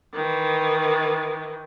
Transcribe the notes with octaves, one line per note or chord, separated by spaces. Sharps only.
D#3 E3